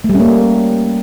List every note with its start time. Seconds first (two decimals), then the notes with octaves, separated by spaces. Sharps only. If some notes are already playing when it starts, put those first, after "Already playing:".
0.04 A3
0.10 G3
0.15 C#4
0.20 A#3